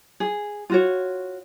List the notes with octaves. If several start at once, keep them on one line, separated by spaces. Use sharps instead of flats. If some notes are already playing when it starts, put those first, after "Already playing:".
G#4
F4 F#4 C#5